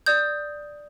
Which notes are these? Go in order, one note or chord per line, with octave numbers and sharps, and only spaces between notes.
D5 D#6 G6